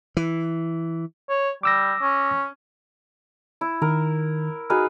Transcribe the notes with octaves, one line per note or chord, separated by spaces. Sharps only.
E3
C#5
G3 D6 E6 A#6
C#4
E4
D#3 A#4
D#4 F#4 G#4 B4 F6